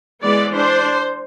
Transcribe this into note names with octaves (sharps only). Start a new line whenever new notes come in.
E3 G#3 B3 D5
D4 C5